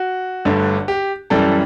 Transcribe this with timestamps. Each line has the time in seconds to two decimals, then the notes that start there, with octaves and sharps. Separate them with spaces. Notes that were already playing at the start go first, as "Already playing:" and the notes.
Already playing: F#4
0.45 G1 G2 D3 A3
0.88 G4
1.30 F#2 E3 G3 A4